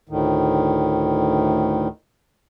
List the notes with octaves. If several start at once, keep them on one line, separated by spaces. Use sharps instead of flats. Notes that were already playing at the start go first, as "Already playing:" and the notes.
D2 A2 D#3